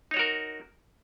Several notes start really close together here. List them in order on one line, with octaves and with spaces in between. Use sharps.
D#4 C#5 F#4 A#4